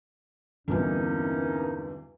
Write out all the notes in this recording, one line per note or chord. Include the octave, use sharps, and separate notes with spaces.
B1 E2 G2 D3 A#3 C4 C#4 D#4